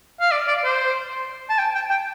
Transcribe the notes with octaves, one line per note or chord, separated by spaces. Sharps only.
F5
D5
D5
C5
A5
G5
G5
G5